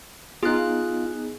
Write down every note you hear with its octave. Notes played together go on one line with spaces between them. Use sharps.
B3 D#4 F4 G#4 F#6